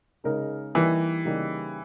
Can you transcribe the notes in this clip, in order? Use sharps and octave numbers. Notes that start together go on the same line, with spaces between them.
C#3 G#3 D#4 A#4
E3 G3 A#3 D#4 G4 B4
C#3 G3 A#3 D#4 G4